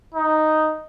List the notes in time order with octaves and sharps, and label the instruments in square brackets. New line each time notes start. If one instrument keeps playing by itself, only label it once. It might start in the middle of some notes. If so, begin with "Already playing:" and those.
[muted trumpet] D#4